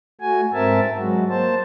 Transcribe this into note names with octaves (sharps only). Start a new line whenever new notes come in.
A3 F#4 G#5
G#2 C4 A#4 E5 A5
F#3 G#3 F#4
A#3 C5 A5